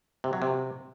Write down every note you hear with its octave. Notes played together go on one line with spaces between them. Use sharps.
C3
F#3
C3